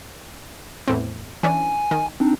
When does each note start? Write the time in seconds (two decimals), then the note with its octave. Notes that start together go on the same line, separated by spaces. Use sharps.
0.88 E2 A2 C4
1.43 E3 C#4 D4 G#5
1.91 D#3
2.20 C4 D4 D#4